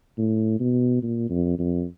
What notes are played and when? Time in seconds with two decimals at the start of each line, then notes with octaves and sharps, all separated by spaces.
0.18 A2
0.60 B2
1.02 A#2
1.30 F2
1.59 F2